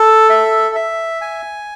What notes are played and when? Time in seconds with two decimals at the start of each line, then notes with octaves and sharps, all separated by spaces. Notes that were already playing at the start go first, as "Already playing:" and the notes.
Already playing: A4
0.30 E5
0.75 E5
1.21 G#5